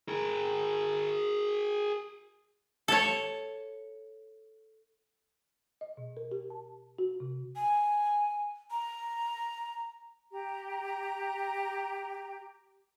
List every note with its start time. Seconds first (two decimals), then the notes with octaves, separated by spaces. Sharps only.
0.08 G#4 A#4
2.88 A4 C#5
5.81 D#5
5.97 B2
6.17 A#4
6.32 G4
6.50 A5
6.98 F#4
7.20 C3
7.56 G#5
8.71 A#5
10.31 G4 A#5